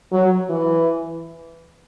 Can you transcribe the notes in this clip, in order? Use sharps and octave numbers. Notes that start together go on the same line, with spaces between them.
F#3
E3